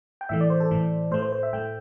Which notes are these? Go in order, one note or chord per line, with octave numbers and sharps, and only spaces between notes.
G5
A2 E3 A3 E5
D5
C5
A4
A2 E3 A3
A2 A3 C5
C5
C5
E5
A2 A3 G5